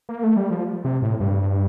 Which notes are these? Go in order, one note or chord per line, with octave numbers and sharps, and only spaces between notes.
A#3
A3
G3
F3
C3
A2
G2